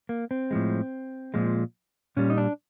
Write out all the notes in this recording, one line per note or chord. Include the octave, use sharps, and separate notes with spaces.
A#3
C4
A2 F3 G#3
A#2 F3 G#3
A#2 G3 C#4
D#4
D4